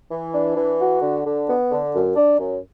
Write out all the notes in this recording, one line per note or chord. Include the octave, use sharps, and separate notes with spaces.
E3
D4
E3
F#4
D3
D3
B3
D3
F#2
D4
F#2